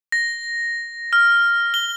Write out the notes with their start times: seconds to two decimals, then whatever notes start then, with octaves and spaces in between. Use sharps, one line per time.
0.12 A#6
1.13 F6
1.74 G7